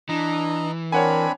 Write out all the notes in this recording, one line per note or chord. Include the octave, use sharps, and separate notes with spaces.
E3 D4 D#5 A#5
C4 D4 A#4 C#5 F#5 G#5 B5